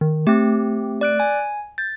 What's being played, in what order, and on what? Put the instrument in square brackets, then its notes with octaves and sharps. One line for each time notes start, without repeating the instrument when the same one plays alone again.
[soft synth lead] D#3
[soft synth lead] A3 [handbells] C4 G4
[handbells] D5 F#6 D7
G#5
[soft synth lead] G6 [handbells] A6